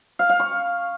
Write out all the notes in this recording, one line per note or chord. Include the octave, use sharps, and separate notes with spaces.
F5
F5
C#6